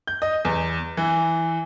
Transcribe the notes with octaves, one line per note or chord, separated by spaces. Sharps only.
G6
D#5
E2
E3